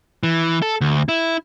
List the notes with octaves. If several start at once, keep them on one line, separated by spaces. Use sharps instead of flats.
E3
A4
D2
E4